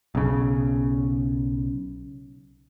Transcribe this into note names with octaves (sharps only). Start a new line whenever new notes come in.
B1 C#3